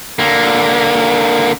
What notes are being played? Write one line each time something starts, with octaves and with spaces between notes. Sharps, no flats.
D3 A#3